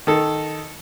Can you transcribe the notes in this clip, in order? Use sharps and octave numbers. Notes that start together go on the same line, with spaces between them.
D#3 A4